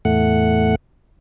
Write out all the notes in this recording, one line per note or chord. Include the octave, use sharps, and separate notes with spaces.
E2 A2 A3 F#5